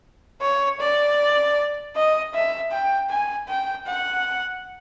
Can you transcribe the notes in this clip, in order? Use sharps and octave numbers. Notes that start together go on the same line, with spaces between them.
C#5
D5
D#5
E5
G5
G#5
G5
F#5